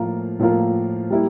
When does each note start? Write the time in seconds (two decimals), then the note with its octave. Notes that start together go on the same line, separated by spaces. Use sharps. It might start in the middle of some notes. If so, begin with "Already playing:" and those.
Already playing: A2 F3 A#3 F4 A#4
0.39 A2 F3 A#3 F4 A#4
1.10 G3 A#3 E4